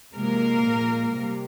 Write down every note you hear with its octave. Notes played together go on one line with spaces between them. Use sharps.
C3 F3 G#3 A#3 A#4
A#2 G#3
C3 G3